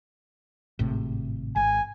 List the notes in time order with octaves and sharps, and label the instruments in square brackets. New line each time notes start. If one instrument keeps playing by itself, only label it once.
[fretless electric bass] G#1 A2 C3
[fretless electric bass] G#1 [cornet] G#5